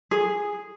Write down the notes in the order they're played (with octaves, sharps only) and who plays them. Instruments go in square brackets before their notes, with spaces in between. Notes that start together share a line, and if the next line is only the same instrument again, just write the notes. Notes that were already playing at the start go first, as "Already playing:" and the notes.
[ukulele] G#4